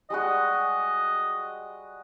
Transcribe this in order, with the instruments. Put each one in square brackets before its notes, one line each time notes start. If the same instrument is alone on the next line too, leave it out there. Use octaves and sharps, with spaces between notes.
[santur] G3 G#3 F#4 [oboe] D#5